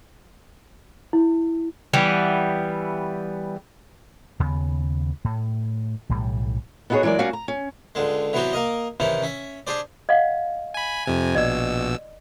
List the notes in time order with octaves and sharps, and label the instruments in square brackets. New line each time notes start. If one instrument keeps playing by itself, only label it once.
[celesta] E4
[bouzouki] E3 G3 B3
[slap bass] D#2 C#3 B3
A2
B1 A2 E3 G3
[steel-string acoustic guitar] B3 D#4 E4 F#4 G#4 C#5
E3 F#3 G#3 A#3 D5
G3 A#3 C#4 F#4 F5
A#5
C#4
[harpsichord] C#2 D3 G#3
E3 F#3 B3 C4 F#4 G4
A#3 A#4 D#5
C3 D#3 E3 C#4 D#4 E4
C#4 E5
D4 G4 G#4 C5 D5
[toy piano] D#5 F5 F#5
[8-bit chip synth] G#5 B5
F2 C3 G#5
[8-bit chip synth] A#1 B2 E6 [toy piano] D5 D#5